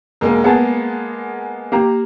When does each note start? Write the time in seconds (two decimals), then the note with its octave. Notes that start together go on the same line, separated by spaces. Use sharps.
0.21 E1 G#3 A#3 A#4
0.44 B3 G#4 A5
1.72 A#3 G4 A#5